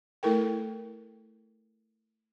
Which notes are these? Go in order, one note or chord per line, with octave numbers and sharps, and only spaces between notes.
A3 E4 A4 A#4 G5